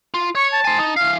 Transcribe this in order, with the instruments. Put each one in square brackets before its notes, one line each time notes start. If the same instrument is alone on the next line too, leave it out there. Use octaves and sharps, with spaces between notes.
[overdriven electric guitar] F4
[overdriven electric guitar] C#5 [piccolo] C#6
[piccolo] A5
[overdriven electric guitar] C5 G#5
D#4
[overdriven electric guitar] E3 F5 [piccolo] F6